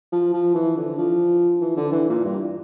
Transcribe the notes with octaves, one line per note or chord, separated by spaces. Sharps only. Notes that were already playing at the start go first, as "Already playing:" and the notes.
F3
F3
E3
D3
F3
E3
D3
E3
A#2
G2